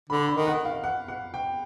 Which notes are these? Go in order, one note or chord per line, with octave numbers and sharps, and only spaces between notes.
D3 B5
B5
D#3
F#5
F5
F#5
F#5
G5